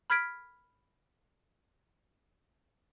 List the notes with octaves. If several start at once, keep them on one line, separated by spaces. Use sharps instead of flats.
B5 F6 G#6 B6 D7